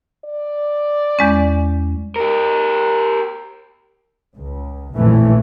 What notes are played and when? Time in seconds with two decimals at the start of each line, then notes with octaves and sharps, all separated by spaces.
0.25 D5
1.19 E2 G#3 C#4
2.16 G4 A#4
4.36 C#2
4.95 A#1 F2 A2 E3 A3